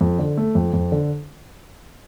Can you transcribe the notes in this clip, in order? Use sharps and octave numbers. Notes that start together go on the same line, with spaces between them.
F2
D3
A3
F2
F2
D3